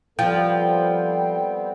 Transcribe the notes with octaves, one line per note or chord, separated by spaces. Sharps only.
F3 G3 B3 C4 A4 G5